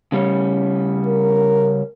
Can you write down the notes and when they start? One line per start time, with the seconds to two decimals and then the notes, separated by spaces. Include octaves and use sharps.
0.12 C#3 G3 C#4
1.07 A#4